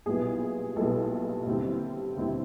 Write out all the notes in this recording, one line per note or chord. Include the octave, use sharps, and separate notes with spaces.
B1 A#2 G3 B3 E4 G#4
B1 A#2 G3 B3 E4 A4
D#2 D3 G3 C4 E4
D#2 D3 G3 C4 E4